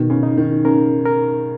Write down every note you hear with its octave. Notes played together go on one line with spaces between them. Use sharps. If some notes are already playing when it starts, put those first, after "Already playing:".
Already playing: B2 D#3
C#3
D#4
D#3
C#3 A#4
A#4